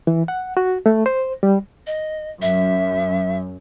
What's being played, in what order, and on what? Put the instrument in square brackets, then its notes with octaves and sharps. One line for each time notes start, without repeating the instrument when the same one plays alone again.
[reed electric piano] E3
F#5
F#4
A3
C5
G3
[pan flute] D#5
[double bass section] F#2 [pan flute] E5